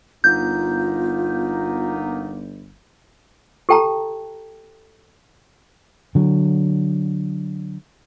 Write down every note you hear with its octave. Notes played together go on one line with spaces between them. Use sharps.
G1 A#3 B3 D#4 F4 G6
G4 A4 G5 A5 A#5
D3 F#3